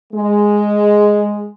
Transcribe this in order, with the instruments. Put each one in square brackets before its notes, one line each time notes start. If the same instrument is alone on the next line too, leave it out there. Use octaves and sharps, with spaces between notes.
[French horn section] G#3